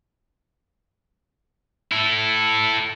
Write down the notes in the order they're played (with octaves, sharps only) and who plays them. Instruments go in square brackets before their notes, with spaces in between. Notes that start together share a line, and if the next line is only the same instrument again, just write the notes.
[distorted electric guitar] E4 A4